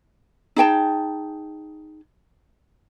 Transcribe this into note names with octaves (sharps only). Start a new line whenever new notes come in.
D#4 G#4 G5 A5